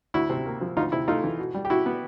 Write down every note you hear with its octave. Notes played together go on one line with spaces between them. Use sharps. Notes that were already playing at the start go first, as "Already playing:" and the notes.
D2 E4 F#4
C3
A#3
F3
D2 D#4 F4
C3 E4
A3 D#4 F4
E3
B2
G3
G4
B2 E4 F#4
B3